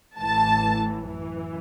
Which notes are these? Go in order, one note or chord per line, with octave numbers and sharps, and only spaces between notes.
A1 A2 E3 A5
F#2 E3